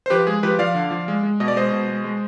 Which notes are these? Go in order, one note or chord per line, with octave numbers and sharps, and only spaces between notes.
C5
F3 G4 B4
G#3 G#4
F3 G4 B4
F3 D5 F5
D3
F3
G#3
G#3
B2 D#5
D5
G#3 C5 D#5
B2
G#3
G#3